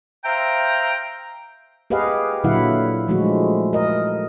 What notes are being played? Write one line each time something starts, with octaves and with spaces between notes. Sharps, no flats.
C5 E5 F5 G5 A#5
G4 G#4 B4 D#5 F5 F#5
A#2 D3 F#3 E4 F5 F#5
D3 F3 G#3 A3 E4 F#4
A#4 D#5